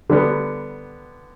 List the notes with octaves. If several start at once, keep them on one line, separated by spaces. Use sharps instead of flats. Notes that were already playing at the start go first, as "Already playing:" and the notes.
D3 G3 B3